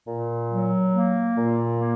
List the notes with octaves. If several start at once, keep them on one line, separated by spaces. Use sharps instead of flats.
A#2
F#3
A#3
A#2
A#3